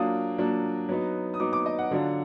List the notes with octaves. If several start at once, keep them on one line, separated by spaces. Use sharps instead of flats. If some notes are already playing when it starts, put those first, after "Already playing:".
Already playing: F#3 A#3 D4 F4 D#6
F#3 A#3 D4 F4
F#3 B3 D#4
D#6
F#3 B3 D#4 D6
D6
D#5
F#5
D3 F#3 D4 F4